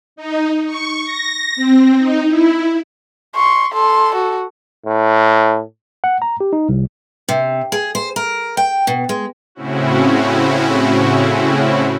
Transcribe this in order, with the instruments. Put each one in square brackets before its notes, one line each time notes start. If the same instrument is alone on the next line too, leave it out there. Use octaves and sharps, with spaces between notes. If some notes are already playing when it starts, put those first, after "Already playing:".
[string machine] D#4
C#6
A#6
C4
D#4
E4
[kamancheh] C6 [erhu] C#6
[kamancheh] A4 [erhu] C6
[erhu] F#4
[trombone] A2
[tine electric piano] F#5
A#5
G4
D#4
C2
[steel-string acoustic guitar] C3
G#4
C5
A#4
G5
B2
G#3
[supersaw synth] A2 C#3 C4 C#4 E4 F#4